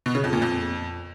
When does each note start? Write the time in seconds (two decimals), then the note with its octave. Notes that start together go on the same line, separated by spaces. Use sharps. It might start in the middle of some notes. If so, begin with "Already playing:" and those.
0.06 B2
0.15 C#3
0.24 F2
0.33 A#2
0.42 F2